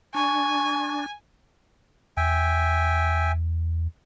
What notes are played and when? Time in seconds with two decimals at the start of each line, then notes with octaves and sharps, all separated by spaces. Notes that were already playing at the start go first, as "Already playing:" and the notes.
0.15 D4 G#5 C#6
2.17 E2 E5 G5 G#5